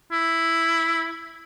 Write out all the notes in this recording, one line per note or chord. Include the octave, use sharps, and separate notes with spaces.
E4